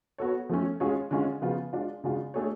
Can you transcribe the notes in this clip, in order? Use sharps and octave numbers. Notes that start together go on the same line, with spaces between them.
B3 F#4 A4 C#5
F3 A3 C#4
G#3 C#4 F4 G#4 C#5
D3 G#3 C#4 F4
C#3 F3 B3 F4
G#3 D4 F4
C#3 G#3 D4 F4
A3 D4 G#4 C#5